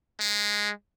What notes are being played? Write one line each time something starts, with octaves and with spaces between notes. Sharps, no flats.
G#3